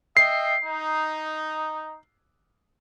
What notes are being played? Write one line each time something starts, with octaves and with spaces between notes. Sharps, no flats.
D#5 E5 G5 C7
D#4